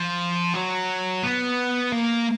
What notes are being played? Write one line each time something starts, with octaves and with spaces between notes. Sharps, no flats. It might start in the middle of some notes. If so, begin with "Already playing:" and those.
Already playing: F3
F#3
B3
A#3